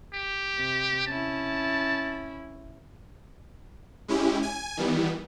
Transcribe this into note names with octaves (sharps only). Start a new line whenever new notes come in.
G4
C3
C#4 E4 A5
G#3 C#4 E4 G4
G#5
D#3 E3 G3 B3